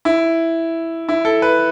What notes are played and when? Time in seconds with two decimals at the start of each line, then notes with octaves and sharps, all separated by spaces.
0.05 E4
1.09 E4
1.25 A4
1.42 B4